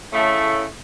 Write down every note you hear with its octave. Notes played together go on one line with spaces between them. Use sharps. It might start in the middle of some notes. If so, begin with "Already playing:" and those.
A2 C#3 A3